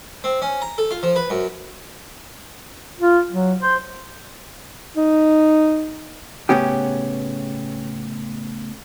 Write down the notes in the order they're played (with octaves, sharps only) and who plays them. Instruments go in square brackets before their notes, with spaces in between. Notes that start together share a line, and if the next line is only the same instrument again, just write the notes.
[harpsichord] C4
C#4
A#5
A4
F4
F3
B4
F#2
[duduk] F4
F#3
C5
[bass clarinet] D#4
[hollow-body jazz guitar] A2 C#3 B3 C#4 G4